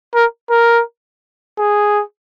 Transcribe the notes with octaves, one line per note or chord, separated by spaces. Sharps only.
A#4
A#4
G#4